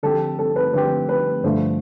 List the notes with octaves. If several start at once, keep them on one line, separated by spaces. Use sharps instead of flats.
D3 F3 C4 G4 A4
A4
B4
D3 F3 C4 G4 B4
B4
G2 D3 F3 A3 C5